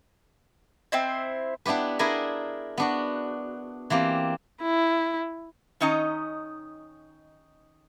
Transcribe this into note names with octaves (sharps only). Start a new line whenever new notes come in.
C4 E4 C5 D#5 G5
B3 D4 E4 G4 B4
D4 E4 G#4 A#4 G#5 B5
B3 D4 F#4
E3 A#3 C4 G4
E4
D#3 C#4 D#4 D#5 A#5